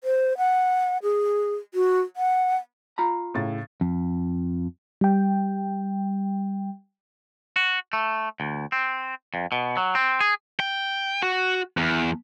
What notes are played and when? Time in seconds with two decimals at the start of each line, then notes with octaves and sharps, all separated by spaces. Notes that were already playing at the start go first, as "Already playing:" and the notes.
0.04 C5
0.38 F#5
1.03 G#4
1.74 F#4
2.17 F#5
2.98 F4 A#5 B5
3.34 A2 C#3 A6
3.81 F2
5.01 G3 G5
7.56 F#4
7.93 A3
8.40 D2
8.72 C4
9.34 F2
9.52 B2
9.77 F#3
9.95 C4
10.21 G#4
10.60 G5
11.23 F#4
11.77 E2